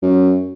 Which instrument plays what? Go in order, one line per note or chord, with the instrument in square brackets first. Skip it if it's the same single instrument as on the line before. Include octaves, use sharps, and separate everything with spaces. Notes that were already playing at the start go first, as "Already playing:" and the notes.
[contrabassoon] F#2